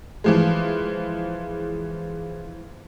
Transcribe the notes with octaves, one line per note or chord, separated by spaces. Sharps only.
E3 F3 G#3